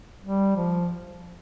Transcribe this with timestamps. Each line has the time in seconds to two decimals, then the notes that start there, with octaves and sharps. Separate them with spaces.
0.22 G3
0.56 F3